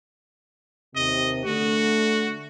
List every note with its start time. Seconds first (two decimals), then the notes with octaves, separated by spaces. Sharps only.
0.96 D#2 C3 D#5
1.46 D3 A3 F#4